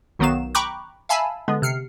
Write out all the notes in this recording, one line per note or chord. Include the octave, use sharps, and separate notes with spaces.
B1 D#3 F#3 B3 F5 E7
G5 A#5 B5 C#6 D6 F#6
E5 F5 G#5 A5 B5 E6
D3 G#3 B3
C3 F6 C7 C#7